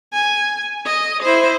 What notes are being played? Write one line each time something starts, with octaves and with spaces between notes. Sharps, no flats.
G#5
D#5
E4 C5